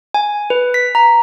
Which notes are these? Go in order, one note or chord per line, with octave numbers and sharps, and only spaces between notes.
G#5
B4
B6
A#5